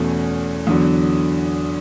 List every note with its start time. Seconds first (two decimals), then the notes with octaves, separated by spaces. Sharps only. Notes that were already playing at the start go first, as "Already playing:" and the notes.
Already playing: E2 B2 A3 C#4
0.67 E2 D3 F#3